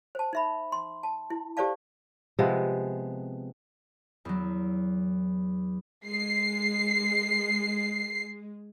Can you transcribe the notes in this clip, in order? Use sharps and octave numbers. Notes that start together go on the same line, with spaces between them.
C5 A5
D#4 E5 B5
C6
A5
E4
G4 A4 C5 D5 F5 A5
C3 F3 G#3 B3
E2 F#3
G#3 C7